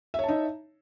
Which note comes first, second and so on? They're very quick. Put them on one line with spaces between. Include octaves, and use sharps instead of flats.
E5 C#5 A5 D#4